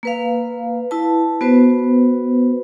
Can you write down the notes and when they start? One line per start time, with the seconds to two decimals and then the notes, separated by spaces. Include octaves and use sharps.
0.03 A#3 B4 F5
0.91 E4 B4 A5
1.41 B3 F#4 B4 C5